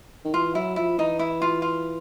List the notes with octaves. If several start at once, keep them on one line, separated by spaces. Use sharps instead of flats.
D#3
E3 F4
F#3 E4
F3 E4
E3 D#4
E4
F4
F4